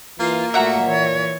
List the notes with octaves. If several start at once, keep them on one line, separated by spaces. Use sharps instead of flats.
E3 A#3 F4
A#2 A3 F#4 E5 F#5 A#5
E3 C#5